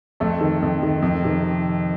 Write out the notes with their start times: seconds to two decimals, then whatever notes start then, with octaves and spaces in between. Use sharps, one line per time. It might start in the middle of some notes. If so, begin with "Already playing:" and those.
0.20 F2 A3 A4
0.41 D#3
0.62 F2
0.83 D#3
1.02 F2
1.23 C3 D#3